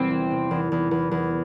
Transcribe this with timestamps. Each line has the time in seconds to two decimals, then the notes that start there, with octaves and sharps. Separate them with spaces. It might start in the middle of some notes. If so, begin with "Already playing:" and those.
Already playing: E2 C3 G3 C4
0.10 E3
0.31 C3
0.51 E2
0.72 E2
0.91 E2
1.11 E2